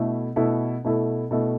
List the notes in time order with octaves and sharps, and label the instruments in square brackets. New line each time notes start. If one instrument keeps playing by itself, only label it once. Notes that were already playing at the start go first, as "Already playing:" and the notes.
Already playing: [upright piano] B2 A3 E4 A4
B2 A3 E4 A4
B2 A3 E4 A4
B2 A3 E4 A4